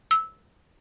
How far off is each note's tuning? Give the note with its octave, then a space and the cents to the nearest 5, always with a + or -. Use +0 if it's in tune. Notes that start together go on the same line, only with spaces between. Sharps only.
E6 -15